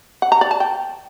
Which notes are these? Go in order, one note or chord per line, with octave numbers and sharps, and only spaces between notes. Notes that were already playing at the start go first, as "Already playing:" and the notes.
F#5
A#5
D5
A5
G5